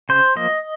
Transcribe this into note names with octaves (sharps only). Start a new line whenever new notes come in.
C#3 C5
F3 A#3 D#5